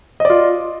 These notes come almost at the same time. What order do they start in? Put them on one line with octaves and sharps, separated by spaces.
D#5 D5 F4